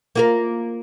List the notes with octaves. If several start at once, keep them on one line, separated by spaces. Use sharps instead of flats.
A#3 F4 A#4